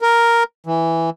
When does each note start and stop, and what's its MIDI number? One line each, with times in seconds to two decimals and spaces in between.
0.02 0.43 70
0.67 1.10 52